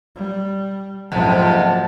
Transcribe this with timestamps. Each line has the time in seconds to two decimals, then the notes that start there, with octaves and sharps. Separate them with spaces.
0.16 G3
1.12 F#1 F2 G#2 C3 F3 F#5 A5